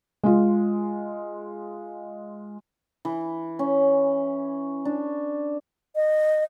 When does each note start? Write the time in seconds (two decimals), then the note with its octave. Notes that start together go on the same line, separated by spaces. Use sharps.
0.24 G#3 F4
3.05 E3
3.59 C#4
4.85 D4
5.96 D#5